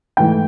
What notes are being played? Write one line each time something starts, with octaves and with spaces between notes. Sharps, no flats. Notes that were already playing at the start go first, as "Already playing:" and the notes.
G#2 E3 A3 G5